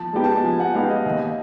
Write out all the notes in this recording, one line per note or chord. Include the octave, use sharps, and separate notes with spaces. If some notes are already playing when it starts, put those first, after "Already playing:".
Already playing: F3 A5
G#3 B3 D#4 G4
A5
F3 G#5
F#5
G#3 B3 D#4 G4 F5
D#5
D#2 E5
D#5